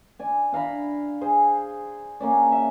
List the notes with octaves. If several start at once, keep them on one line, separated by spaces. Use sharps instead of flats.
D5 G#5
D4 F5 A#5 B5
G#4 C5 C6
A#3 C#4 D5
E5